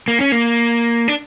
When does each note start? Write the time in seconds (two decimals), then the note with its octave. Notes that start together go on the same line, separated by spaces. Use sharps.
0.08 A#3
0.20 C#4
0.32 A#3
1.08 D4